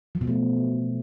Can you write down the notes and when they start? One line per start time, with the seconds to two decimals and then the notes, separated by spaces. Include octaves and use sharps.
0.15 F3
0.21 B2
0.27 A3